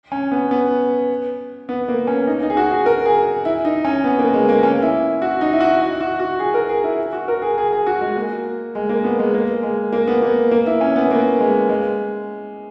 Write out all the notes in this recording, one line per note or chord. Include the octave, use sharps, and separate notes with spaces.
C#4
B3
B3
B3
A#3
C#4
D#4
D#4
G#4
F#4
G#4
A#4
G#4
E4
D#4
C#4
B3
A#3
G#3
A#3
C#4
E4
F#4
D#4
E4
F#4
E4
F#4
F#4
G#4
A#4
G#4
E4
F#4
A#4
G#4
G#4
G#4
F#4
G#3
A#3
G#3
A#3
B3
G#3
A#3
G#3
A#3
B3
A#3
A#3
E4
C#4
B3
A#3
G#3
G#3